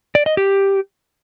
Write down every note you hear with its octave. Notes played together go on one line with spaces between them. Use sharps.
D5
D#5
G4